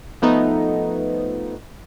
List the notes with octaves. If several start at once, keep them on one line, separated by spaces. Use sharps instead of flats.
F3 A3 B3 D#4